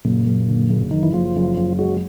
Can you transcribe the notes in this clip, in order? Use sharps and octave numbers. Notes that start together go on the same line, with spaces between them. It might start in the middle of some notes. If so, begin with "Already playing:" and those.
F#1 A#2
F#1
D3
F#1
F#1 D#3
E3
F#1 F3
F#1
F#1
F#3 G#3